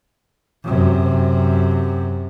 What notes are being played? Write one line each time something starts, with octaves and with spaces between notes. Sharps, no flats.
F#2 C3